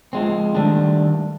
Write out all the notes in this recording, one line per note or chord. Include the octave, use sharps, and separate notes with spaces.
F3 G#3 C4
D#3 G3 A3 D4